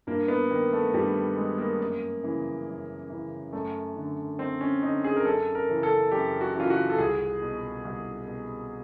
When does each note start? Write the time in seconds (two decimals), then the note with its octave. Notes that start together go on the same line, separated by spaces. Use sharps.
0.07 G2 A#3
0.28 B3
0.50 D#3 A#3
0.73 A3
0.94 G2 G3
1.37 D#3 G#3
1.58 A#3
1.80 F#2
2.23 C#3 E3
2.67 F#2
3.10 C#3 E3
3.53 F#2 A3
3.96 D3
4.39 F#2 C4
4.61 C#4
4.82 D3 D#4
5.04 G#4
5.16 A#4
5.25 F#2 A4
5.55 A#4
5.69 C#3 E3
5.83 A4
6.11 F#2 G4
6.41 F#4
6.56 C#3 E3 F4
6.70 F#4
6.90 A4
6.98 C2 G#4
7.42 B2
7.85 C2
8.28 B2